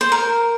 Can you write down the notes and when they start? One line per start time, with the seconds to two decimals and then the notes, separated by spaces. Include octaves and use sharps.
0.01 C5
0.12 A#4